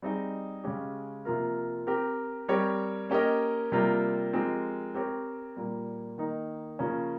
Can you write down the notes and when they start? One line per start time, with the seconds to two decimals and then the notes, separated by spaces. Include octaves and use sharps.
0.02 G3 C4 D#4 G#4 D#5
0.64 C#3 G#3 C#4 G4
1.25 C3 F3 A#3 F4 A#4
1.87 C4 G4 A#4
2.48 G3 C4 G4 A#4 C#5
3.10 A#3 C#4 G4 A#4 D#5
3.72 C3 G3 A#3 F4 A#4
4.33 F3 G#3 C4 G4 A#4
4.94 C4 G4 A#4 C#5
5.56 A#2 G3 A#3
6.18 D#3 A#3 D#4
6.79 C#3 F3 A#3 C#4